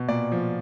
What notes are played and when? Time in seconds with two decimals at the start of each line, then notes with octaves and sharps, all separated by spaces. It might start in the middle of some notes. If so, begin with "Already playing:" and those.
Already playing: B2
0.08 A#2 D5
0.32 F3